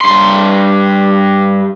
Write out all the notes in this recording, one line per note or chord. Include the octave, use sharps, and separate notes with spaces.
G2 C6